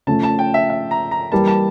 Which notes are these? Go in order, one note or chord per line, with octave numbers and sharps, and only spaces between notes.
C#3 F3 A3 C#4 A5
A5
G5
E5
E5
A#5
A#5
E3 G3 A#3 A5
A5